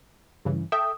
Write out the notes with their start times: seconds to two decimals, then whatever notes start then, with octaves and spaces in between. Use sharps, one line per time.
0.45 G2 C#3 E3
0.72 A4 E5 G5 D#6